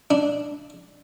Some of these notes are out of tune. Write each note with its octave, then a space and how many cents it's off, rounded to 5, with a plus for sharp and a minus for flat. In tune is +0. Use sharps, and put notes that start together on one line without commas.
D4 -5